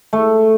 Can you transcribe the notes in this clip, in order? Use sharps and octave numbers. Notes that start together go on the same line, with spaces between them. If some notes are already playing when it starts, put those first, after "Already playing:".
A3